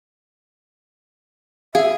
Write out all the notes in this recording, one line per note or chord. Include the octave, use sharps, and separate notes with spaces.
G#4 E5 F5